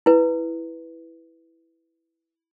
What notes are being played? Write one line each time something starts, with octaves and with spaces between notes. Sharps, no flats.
E4 B4